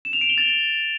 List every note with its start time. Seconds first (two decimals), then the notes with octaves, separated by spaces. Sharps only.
0.05 E7
0.13 F7
0.21 D7
0.29 G7
0.38 A6